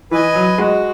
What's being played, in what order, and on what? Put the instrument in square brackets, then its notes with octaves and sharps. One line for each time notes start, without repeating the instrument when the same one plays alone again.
[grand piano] E3 [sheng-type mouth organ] B4 D#5 G#5
[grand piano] F#3
[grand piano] G#3 [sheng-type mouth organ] F#4